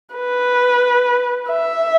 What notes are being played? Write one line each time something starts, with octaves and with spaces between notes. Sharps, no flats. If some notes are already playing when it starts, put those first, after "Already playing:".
B4
E5